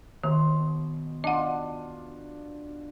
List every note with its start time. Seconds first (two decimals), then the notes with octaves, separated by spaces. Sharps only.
0.24 B2 D#3 C6
1.24 D4 F4 D#5 F#5